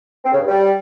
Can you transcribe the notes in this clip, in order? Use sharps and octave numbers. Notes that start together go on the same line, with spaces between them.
C4
C#3
G2
G3